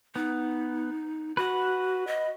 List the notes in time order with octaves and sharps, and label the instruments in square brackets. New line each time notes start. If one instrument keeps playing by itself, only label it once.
[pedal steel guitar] B3 [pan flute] D#4
[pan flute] F#4 [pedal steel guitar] B4 F#5
[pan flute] D#5